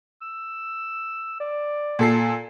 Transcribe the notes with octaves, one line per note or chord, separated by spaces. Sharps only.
E6
D5
A#2 A4 C7